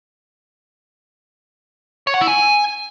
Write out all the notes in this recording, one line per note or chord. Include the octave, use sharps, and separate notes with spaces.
C#5
F#5
E4
G#5